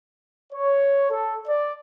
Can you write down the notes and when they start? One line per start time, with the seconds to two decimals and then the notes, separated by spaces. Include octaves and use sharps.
0.53 C#5
1.10 A4
1.47 D5